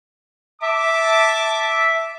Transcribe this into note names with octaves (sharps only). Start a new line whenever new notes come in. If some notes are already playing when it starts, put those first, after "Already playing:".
E5 A5 D6